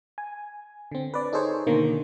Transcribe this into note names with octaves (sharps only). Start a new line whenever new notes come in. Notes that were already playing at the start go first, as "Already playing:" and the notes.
G#5
D3 C4
B4 D5
D#4 G#4 A4 C5 C#5
B2 D3 D#3 A#3